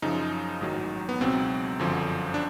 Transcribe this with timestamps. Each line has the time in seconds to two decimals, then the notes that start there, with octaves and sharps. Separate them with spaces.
0.02 F#2 C#3 F3 D#4
0.61 A1 G#2 D#3 F#3
1.09 B3
1.21 C#2 B2 F#3 C4
1.79 G1 F#2 D3 F3
2.34 D4